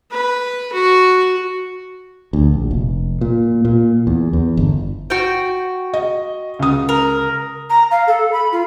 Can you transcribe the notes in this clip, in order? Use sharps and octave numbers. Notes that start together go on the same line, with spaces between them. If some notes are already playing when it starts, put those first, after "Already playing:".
B4
F#4
D2
A#1
F1
A#2
A#2
E2
E2
G1
F#4 G5
D#5
C#2 D#6
A#4
A#5
F5
A4
B5
F4